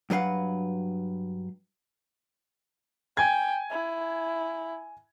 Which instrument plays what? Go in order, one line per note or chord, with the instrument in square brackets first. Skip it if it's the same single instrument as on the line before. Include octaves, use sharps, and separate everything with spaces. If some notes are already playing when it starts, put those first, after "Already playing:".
[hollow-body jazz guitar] G2 F#3 B4 F5 F#5
[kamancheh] G5 [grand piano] G#5 G#6
[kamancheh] E4